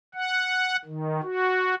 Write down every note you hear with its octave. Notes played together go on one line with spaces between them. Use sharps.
F#5
D#3
F#4